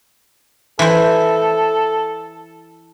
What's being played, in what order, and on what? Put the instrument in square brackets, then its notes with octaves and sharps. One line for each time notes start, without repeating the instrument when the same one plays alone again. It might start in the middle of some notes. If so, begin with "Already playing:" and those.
[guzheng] E3 C5 [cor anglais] A4